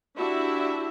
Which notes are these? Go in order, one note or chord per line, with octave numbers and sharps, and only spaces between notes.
D4 E4 F#4 G4 E5